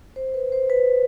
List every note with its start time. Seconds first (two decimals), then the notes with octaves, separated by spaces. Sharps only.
0.16 C5
0.34 B4
0.52 C5
0.70 B4